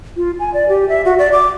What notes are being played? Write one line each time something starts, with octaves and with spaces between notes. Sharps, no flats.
F4
G#5
D5
G4
E5
F#4
D5
D6